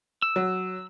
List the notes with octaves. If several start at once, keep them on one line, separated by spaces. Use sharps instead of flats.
E6
F#3